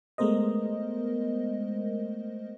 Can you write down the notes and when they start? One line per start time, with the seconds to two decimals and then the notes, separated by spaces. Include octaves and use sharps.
0.18 G#3 A3 B3 A#4 C5 D#5